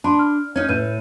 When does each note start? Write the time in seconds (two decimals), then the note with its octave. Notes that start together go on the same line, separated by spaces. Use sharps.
0.04 D4 A5 B5 C6
0.19 F6
0.56 C#4 D#4 F6 G#6
0.69 A2 B4 G6 D#7